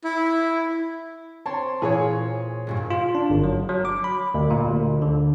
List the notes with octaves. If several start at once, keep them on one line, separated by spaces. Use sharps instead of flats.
E4
C4 C#5 A5 C6
A#2 E3 G#4 C#5
C#2 G2 A#2
F4
D4
G1
F#3
F#3
D6
B5
D2
A#2
D2
D3